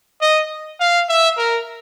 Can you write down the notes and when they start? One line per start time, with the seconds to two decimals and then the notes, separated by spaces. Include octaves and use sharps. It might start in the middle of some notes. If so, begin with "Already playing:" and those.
0.21 D#5
0.80 F5
1.09 E5
1.38 A#4